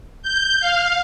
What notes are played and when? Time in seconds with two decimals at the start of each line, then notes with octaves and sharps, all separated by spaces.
0.23 G6
0.60 F5